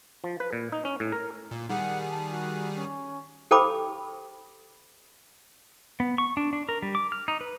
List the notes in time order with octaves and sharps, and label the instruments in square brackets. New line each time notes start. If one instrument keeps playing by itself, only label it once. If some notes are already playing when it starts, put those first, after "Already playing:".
[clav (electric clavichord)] F3
B4
A#2
D#4
C#4
A2
A#4
[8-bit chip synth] A#2
[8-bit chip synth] D#3 G3 G#4 [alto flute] F#5
[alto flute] A5
F#4
C#4
[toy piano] G4 A4 C5 G5 B5 D6
[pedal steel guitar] B3
C#6
D4
D4
A#4
G3
D6
F6
D#4
B4